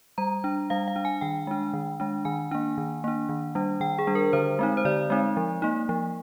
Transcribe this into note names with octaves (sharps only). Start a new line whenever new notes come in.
G3 A#5
D4
G3 F5
F5
D4
G#5
D#3 G5
G#3 D4
D#3
G#3 D4
D#3 G#5
A#3 D4
D#3
A#3 D4
D#3
G3 D4
D#3 G5
G#4
G3 D4
A#4
D3 C5
G#3 C4 D#4
C5
D3 D5
G#3 C4 D#4
F3
A#3 D#4
F3